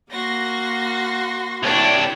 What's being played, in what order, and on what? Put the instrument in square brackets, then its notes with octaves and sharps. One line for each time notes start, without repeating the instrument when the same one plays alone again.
[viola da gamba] A#3 [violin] F#4 C6 [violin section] A#6
[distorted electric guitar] C2 D4 [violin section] E4 G4 C#5